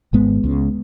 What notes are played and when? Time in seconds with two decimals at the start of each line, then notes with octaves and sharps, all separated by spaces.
0.13 G#1 G#2 G#3 B3
0.44 C#2 C#3